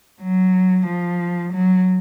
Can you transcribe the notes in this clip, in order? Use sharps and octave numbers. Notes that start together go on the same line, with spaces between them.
F#3
F3
F#3